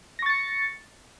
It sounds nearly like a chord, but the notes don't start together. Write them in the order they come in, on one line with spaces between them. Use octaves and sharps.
A#6 C#6 A6 C#7